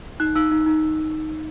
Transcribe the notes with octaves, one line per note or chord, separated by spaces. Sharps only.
D#4 F#6
D#4 E6
D#4
D#4